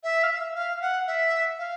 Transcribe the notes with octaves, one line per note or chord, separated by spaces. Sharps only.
E5
F5
E5
F5
F#5
E5
F5